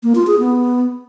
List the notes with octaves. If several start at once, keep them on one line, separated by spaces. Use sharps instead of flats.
A#3
F4
G#4
B3